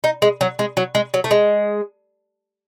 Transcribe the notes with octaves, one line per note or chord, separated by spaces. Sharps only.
D#4
G#3
F#3
G#3
F#3
G#3
F#3
A3
G#3